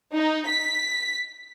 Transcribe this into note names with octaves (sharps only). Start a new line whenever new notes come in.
D#4
B6